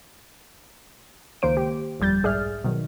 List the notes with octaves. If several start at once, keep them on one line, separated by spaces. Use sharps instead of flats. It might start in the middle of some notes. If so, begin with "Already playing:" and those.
C#2 D#3 A#3 C5 D7
G4
G1 F2 G3 G6 A6
B1 G#2 G#4 D5 E5 F6
B2 D#3 F#3